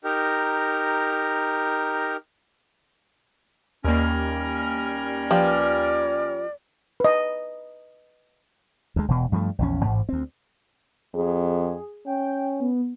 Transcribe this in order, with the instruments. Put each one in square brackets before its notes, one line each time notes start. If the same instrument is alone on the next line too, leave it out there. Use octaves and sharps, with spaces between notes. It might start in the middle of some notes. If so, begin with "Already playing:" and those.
[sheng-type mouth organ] D#4 G4 A#4
[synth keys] D#2 A#3 [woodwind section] G3 C#4 A#4
[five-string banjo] F3 G4 B4 [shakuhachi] D5
[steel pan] B4 D#5
[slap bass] D2 G#3
E1 B2
G2 F3 G3 A3
A#1 E2 C#4
A1 G#2
D2 C4
[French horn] F2 [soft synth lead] G#4
[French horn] C#4 [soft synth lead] G5
[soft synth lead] B3